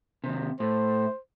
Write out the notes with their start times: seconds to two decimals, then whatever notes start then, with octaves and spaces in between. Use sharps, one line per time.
0.24 D#2 C3
0.60 A2 C5